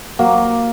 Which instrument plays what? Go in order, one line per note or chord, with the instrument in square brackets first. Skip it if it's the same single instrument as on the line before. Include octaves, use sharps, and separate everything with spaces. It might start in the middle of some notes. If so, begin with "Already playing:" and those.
[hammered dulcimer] F#3 A#3